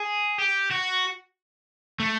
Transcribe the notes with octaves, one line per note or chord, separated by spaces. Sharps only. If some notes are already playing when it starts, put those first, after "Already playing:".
Already playing: G#4
G4
F#4
A3